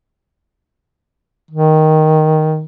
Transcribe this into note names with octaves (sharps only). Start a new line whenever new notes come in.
D#3